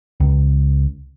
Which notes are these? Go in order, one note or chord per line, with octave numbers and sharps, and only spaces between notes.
C#2